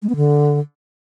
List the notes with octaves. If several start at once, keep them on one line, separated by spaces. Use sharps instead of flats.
G#3
B3
D3